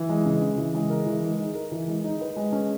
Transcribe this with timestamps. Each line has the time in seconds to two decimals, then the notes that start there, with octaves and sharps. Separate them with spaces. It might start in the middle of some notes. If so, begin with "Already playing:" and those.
Already playing: E3
0.09 G#3
0.26 C#3
0.42 C#3
0.58 E3
0.74 G#3
0.90 A#4
1.06 E3
1.23 G#3
1.39 D#4
1.55 A#4
1.72 E3
1.88 G#3
2.04 D#4
2.21 B4
2.36 G#3
2.52 C#4